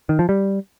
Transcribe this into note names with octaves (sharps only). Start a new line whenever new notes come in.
D#3
F3
G3